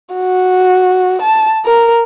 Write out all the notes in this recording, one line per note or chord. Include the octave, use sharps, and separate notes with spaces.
F#4
A5
A#4